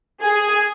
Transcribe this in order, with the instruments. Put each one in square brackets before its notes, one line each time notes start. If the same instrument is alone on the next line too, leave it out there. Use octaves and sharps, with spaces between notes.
[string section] G#4